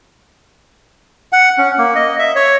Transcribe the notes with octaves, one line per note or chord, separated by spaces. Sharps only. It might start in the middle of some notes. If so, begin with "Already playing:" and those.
F#5
C#4
A#3
D#5
E5
C#5